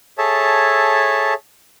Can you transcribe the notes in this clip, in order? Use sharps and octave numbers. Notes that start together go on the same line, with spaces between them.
G#4 A4 C#5 E5 A5